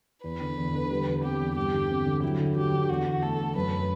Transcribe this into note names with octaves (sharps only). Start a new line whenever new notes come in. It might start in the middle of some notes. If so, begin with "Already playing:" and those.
E2 B4
D3
E2
D3
G3
E2
C4 G4
E2
G2 G4
D3
C4
D3
F#3 E4
D3
F#3 G4
D3
E2 F#4
E2
A3 A4
A3
F#2 B4